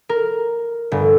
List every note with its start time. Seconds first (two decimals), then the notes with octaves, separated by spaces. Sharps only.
0.09 A#4
0.92 G1